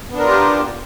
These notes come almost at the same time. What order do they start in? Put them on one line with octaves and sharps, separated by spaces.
B3 D4 A#4 F4 G4